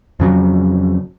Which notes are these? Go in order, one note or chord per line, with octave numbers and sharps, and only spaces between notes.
F2 C#3 F#3